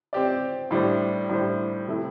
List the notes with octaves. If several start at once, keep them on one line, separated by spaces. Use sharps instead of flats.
C4 G4 D5
A2 G3 D4 C5
A2 G3 D4 C5
C3 A3 E4